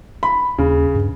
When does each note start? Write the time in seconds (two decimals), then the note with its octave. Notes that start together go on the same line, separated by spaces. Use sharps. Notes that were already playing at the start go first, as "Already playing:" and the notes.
0.23 B5
0.58 D#2 C#3
0.95 G2